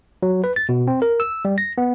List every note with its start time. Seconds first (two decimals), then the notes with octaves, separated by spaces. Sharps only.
0.23 F#3
0.44 B4
0.56 A6
0.69 B2
0.88 C4
1.02 A#4
1.20 E6
1.45 G3
1.58 A#6
1.78 B3